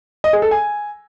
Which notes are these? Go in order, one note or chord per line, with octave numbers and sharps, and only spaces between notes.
D#5
G#4
A4
G#5